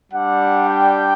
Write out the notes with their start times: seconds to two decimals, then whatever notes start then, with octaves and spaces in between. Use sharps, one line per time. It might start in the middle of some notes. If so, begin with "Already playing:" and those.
0.12 G3 D4 G4 F#5
0.69 G5